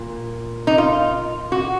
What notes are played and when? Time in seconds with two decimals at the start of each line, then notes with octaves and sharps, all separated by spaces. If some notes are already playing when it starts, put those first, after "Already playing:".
Already playing: A#2
0.67 D#4
0.78 F4
1.52 F#4